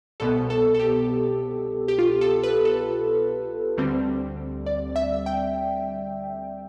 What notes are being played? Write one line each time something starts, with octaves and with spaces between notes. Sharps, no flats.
C2 B2 B3 A4
A4
A4
G4
G4
F4
A4
B4
A4
D2 D3 G3 C4
D5
E5
G5